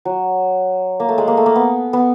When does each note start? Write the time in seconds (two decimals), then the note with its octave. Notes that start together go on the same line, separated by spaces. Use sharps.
0.05 F#3
1.00 A#3
1.09 A3
1.18 G#3
1.28 A#3
1.37 A3
1.46 A#3
1.56 B3
1.93 B3